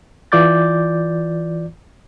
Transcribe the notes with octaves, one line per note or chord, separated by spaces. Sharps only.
E3 F4 D5 D6 G6 A6